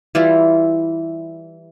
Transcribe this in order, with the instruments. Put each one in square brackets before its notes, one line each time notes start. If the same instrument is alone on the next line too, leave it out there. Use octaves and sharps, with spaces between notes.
[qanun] E3 G3 E4 F4